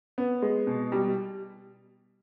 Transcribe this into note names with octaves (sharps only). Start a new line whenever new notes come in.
B3
G#3
B2
G3